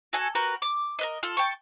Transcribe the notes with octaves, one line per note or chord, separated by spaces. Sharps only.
F#4 A4 G#5
F#4 G4 A#4 B4
D6
A#4 B4 D#5
F4 A4
G5 A5 C#6